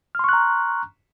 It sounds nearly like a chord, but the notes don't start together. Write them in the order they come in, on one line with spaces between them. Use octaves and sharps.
F6 C6 C#6 F#6 A#5